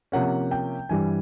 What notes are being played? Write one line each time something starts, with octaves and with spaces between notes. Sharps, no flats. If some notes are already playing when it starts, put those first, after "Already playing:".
C3 F3 A#3 C#4 F#5
G5
G2 E3 G3 G#5